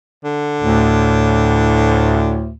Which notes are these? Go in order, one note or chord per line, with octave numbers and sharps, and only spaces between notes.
D3
D2 A2